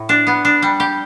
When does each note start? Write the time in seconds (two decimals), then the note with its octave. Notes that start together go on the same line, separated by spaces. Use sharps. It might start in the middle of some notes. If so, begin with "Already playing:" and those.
Already playing: A2
0.09 D4
0.27 B3
0.45 D4
0.62 G3
0.80 G4